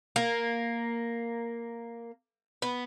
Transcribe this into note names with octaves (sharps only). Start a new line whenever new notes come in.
A#3
B3